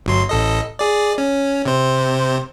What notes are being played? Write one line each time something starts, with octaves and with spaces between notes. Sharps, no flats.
G1 F#3 C6
A1 A4 D#5
G#4 D5
C#4
C3 C5